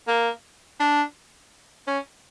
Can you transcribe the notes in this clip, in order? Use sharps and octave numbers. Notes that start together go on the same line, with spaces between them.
A#3
D4
C#4